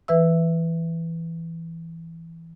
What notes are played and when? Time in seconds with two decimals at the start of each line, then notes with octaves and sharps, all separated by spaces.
0.08 E3 B4 E5 E6